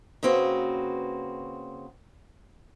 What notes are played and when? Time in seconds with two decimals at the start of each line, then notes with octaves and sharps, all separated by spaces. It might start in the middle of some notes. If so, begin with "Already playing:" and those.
0.23 C#3 A#3 C4 F#4 B4